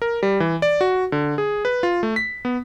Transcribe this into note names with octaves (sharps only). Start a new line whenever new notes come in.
A#4
G3
E3
D5
F#4
D3
G#4
B4
F4
A3
B6
B3